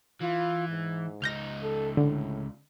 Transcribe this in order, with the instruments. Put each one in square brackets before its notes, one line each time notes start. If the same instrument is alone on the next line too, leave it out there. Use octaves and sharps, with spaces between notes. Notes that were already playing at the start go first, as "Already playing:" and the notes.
[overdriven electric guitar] E3 [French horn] F4
[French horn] G#2
[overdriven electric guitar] C#2 D#4 [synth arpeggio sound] F6 G6 A#6
[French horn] A4
[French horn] A2 [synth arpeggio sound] D3